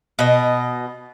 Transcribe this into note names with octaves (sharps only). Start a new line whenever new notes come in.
B2 D#5